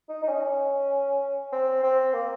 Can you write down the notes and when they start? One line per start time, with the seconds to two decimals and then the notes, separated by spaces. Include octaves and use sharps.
0.09 D#4
0.23 D#4
0.29 C#4
1.53 C4
1.83 C4
2.14 A#3